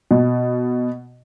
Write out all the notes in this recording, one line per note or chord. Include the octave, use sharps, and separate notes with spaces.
B2